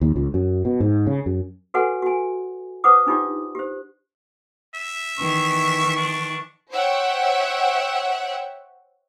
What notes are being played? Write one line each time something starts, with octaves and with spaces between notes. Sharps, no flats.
D#2
C#2
F#2
B2
G#2
C#3
F#2
F#4 A4 B4 C#5 F#5 G#5
F#4 G#5
B4 C5 F#5 D6 D#6
D4 D#4 F4 G4 D5
G4 C5
E5
D#3 E3 C#6
D4
C5 C#5 E5 F#5 G5